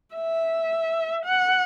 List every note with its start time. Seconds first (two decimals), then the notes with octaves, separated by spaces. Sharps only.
0.15 E5
1.25 F#5